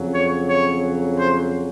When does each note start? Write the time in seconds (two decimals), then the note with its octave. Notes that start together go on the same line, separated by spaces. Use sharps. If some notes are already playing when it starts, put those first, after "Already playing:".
Already playing: F2 C#3 F#3
0.13 C#5
0.48 C#5
1.17 C5